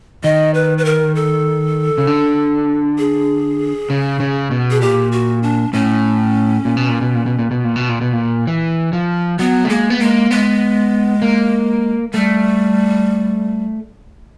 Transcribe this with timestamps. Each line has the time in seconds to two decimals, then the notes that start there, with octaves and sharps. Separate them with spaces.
0.24 D#3 D#5
0.54 B4
0.78 B4
0.85 A#4
1.15 A4
1.98 C#3
2.07 D3
2.98 G#4
3.90 C#3
4.20 C#3
4.51 B2
4.71 G#4
4.81 A#2 G4
5.12 F#4
5.43 D4
5.73 A2 C#4
6.65 A#2
6.77 B2
6.89 A#2
7.01 B2
7.15 A#2
7.26 B2
7.39 A#2
7.51 B2
7.64 A#2
7.76 B2
7.89 A#2
8.01 B2
8.13 A#2
8.47 E3
8.93 F3
9.39 F#3 B3
9.64 A3
9.70 G#3 A#3
9.90 B3
10.00 G#3 A#3
10.31 G#3 B3
11.22 A#3
12.14 G3 A3